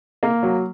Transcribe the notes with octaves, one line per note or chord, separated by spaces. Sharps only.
A#3
F#3